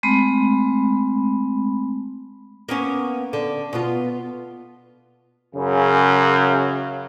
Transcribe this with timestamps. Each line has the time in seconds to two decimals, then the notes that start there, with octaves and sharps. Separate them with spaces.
0.03 G#3 A3 C4 B5
2.69 A#3 B3 C#4
3.33 D3
3.73 B2 B3 F4
5.55 F#2 C#3